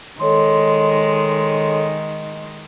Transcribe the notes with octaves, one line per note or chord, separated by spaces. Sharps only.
D#3 G#3 A4 C#5 C6